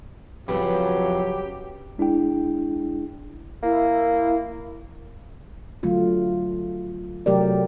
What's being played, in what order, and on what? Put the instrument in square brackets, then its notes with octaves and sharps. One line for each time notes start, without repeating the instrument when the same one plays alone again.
[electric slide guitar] F2 [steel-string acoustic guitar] C#3 G3 B4 [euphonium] F#3 [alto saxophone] G4
[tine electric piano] G#3 D4 E4 G#4 G5
[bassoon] A#3 [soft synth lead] E4
[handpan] D3 F#3 A3 F4
C3 F#3 A3 G4 A#4 D5